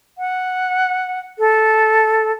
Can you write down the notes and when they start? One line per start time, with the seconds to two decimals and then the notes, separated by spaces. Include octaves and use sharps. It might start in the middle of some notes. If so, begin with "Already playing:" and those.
0.18 F#5
1.39 A4